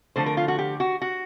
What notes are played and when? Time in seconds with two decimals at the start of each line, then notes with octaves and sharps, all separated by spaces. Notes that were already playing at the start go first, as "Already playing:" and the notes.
0.16 D3 F3 A3 C5
0.26 A#4
0.37 F4
0.48 F#4
0.58 G4
0.80 F#4
1.02 F#4